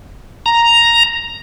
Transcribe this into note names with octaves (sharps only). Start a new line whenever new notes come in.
A#5